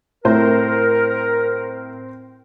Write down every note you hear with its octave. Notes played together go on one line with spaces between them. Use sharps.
A2 C4 A#4 C5